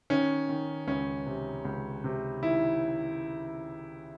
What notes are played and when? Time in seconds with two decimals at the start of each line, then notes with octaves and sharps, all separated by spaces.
0.10 D#3 C#4
0.49 D#3
0.87 C#2 C#4
1.26 C3
1.65 C#2
2.04 C3
2.43 D#3 E4